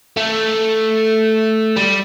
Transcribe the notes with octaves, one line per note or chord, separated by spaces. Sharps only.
A3
G3